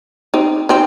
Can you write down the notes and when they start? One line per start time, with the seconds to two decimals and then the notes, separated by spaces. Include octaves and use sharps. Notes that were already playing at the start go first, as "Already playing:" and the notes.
0.34 C4 D#4
0.69 C4 D#4